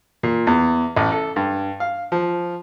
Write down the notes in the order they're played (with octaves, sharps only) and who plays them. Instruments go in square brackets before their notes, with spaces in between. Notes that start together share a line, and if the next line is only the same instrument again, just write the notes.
[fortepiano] A#2
E2
A1
A4
G2
F5
F3